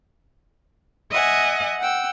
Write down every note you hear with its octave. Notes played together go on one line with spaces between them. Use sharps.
D#5 E5 F#5 G#5
F#5 G5 E6